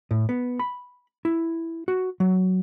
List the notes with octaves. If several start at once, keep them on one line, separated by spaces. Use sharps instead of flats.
A2
B3
B5
E4
F#4
F#3